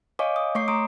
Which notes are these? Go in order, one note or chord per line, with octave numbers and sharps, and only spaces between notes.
C#5 D#5 F5 G#5 C#6 D6
D#6
A3 C#5 C#6 D6 C7
A3 A#5 C6 C#6 D#6 D7